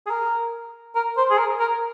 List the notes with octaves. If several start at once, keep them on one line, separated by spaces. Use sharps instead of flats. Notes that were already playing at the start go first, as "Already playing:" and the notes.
G#4
A#4
A#4
C5
G#4
A#4
A#4